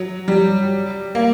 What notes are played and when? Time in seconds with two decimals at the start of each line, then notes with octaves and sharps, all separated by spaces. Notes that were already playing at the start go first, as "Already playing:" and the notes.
Already playing: F#3
0.28 G3
1.15 A#3